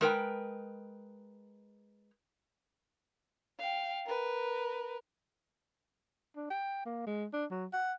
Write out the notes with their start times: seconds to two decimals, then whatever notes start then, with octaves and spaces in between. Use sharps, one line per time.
0.01 G#3 A#4 B4 G5
3.59 F5 G5
4.06 A#4 B4
6.36 D4
6.50 G5
6.86 A#3
7.07 G#3
7.33 D4
7.51 F#3
7.73 F#5